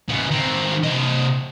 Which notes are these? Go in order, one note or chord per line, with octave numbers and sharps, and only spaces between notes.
C#3 B3
D#3 C4
C3 D#5